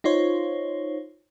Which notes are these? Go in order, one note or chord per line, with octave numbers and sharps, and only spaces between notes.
D#4 F4 C5 C#5